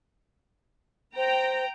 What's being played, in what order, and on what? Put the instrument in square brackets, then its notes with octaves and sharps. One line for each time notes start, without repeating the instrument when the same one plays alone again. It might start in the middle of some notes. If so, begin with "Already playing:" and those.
[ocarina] C5 [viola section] G5 A#5